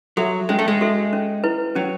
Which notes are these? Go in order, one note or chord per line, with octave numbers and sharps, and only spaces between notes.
F#3 F#4 A4 E5
G#3 C#4
A3
G#3
F#4 A4 E5
C#4
E4 B4
F#3 C#4